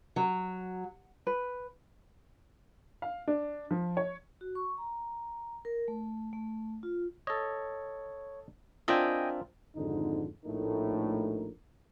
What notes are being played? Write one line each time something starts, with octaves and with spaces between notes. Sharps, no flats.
F#3
B4
F5
D4
F3
C#5
F#4
C#6
A#5
A#4
A3
A3
F4
A4 C#5 D#5
C4 D4 F4 A#4 D#5 E5 G5 G#5
G#1 F2 G#2 D3 D#4
A#1 A2 A3 D#4 A#4